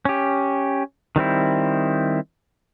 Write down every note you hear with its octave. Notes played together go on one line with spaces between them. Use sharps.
C#4 G4
D#3 G3 C4 E4